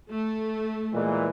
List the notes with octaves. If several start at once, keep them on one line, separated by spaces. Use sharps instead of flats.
A3
A#2 E3 G#3